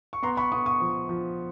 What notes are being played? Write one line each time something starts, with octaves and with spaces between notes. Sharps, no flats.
C#6
B3 A#5 C6
B5 C#6
B3 C#6 D#6
C#6 D#6
F3
F3